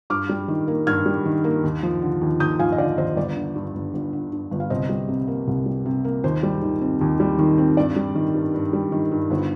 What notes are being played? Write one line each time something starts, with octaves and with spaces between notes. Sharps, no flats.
G2 D6 F6
G3
D#3
A#3
G2 F6 G#6
G3
D#3
A#3
D#2
F3
D3
D#2
D#2 D#6 G6
F3 F5 G#5
D#5
D3 D5 F5
D#2 C5 D#5
G1 D5
D3
G2
G1
G1
D3
G2
G1
F5
C2 C5 D#5
G3
C3
A#3
C2
G3
C3
A#3
D#2 C5
G3
D#3
C4
D#2
G3
D#3
C4
G2 D5
G3
D#3
G2
G2
G3
D#3
G2
G1 C5